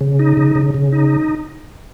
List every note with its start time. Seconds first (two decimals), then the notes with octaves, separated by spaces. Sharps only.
0.01 C#3
0.19 D#4
0.37 C#3
0.55 C#3
0.74 C#3
0.93 D#4